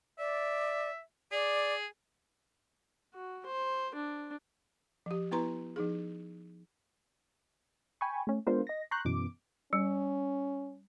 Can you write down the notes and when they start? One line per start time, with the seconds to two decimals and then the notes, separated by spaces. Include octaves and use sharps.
0.19 D5 E5
1.32 G#4 D5
3.14 F#4
3.46 C5
3.95 D4
5.06 F3 G4
5.31 B3 E4 B4 A#5 C6
5.76 F3 D#4 G#4
8.01 G5 G#5 B5 C#6
8.27 A3 C#4
8.47 G#3 B3 D4 F4 A#4 C5
8.67 D#5 A#6
8.91 A#5 C6 C#6 F#6 G6
9.05 F#2 B2 E3 D6
9.73 G3 C#4